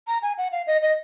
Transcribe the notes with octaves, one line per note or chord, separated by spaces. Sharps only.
A#5
G#5
F#5
F5
D#5
D#5